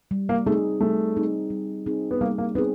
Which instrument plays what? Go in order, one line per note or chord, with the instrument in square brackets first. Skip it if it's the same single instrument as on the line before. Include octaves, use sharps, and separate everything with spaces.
[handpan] G3
[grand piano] A#3
[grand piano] A3 [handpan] C4 D#4 G#4
[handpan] G3 [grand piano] A3
[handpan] C4 D#4 G#4
G3
C4 D#4 G#4
[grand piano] B3
[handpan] G3 [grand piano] A#3
[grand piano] A#3
[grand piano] B3 [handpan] C4 D#4 G#4